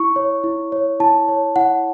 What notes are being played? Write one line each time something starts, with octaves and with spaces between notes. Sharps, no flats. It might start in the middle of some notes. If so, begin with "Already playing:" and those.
Already playing: E4 C#6
C#5
E4
C#5
E4 A5
C#5
E4 F#5